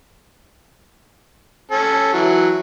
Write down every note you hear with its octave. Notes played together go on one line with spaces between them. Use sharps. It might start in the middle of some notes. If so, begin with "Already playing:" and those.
C#4 A4
E3 F#3